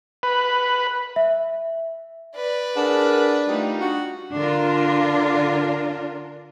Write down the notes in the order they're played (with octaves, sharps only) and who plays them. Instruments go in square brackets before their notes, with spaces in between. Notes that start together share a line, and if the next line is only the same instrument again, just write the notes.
[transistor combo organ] B4
[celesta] E5
[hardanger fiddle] B4 D5
[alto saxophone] D4 [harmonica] G#4 F#5 [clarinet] A#4
[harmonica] G3 D#4 F4 [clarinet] A3
[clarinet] D4 [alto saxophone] F#4
[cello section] D3 D4 F4 A#4